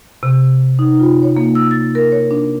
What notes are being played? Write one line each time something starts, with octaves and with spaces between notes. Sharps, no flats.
C3
D#4
F4
C#5
A#3
E6
A6
A#4
C#5
D4